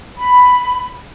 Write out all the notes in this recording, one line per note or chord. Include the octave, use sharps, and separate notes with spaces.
B5